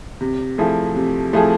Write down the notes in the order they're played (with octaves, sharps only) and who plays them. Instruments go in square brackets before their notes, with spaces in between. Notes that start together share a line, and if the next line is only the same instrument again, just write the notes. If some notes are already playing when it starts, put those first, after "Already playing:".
[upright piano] C3
F3 A3 E4 G#4
C3
F3 A3 E4 G#4